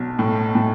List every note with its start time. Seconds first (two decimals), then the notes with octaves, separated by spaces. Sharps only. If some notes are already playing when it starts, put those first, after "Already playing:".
Already playing: B1 B2
0.19 A2
0.55 A2